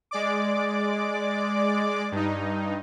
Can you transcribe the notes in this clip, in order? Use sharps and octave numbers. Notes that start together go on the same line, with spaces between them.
G#3 D5 D6
G2 D#4